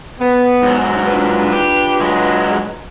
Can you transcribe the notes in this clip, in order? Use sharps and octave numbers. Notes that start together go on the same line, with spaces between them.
B3
G#2 F#3
D4 F4 B4
G4
F#3 G#3